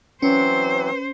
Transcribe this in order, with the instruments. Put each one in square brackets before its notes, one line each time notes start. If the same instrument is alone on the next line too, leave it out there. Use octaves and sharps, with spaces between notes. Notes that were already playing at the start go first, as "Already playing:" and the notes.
[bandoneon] E3 F#3 C4 [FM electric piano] C#4 [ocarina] B4 [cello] C5